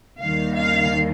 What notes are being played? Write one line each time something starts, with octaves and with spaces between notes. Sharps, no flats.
D#2 D#3 G3 F5
F5